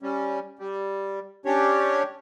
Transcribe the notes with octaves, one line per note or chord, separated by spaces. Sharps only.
G3 C#4
G3
C#4 D4 G4 C#5